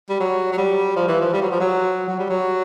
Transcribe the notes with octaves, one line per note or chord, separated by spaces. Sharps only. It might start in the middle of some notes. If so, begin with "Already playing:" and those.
G3
F#3
F#3
G3
F3
E3
F3
G3
F#3
F3
F#3
F#3
G3
F#3